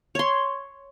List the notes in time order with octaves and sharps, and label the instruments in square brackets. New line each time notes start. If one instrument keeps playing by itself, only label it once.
[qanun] C#5 C6